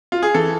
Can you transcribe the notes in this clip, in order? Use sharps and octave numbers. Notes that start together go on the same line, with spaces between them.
F4
G#4
E3 A4